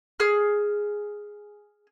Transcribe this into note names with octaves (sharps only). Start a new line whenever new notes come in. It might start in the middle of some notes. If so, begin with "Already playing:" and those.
G#4 F6